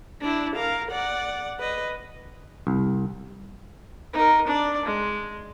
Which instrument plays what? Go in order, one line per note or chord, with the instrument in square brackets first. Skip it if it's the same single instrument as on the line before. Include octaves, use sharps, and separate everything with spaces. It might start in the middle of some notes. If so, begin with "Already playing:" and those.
[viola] D4 E4
A#4 F5
D5 F#5
B4 D#5
[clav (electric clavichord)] C2
[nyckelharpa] D#4 A#4
D4 D5
G#3